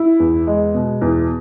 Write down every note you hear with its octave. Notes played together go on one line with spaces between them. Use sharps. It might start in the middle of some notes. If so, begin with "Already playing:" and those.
Already playing: E4
E2
G#3
B2
E2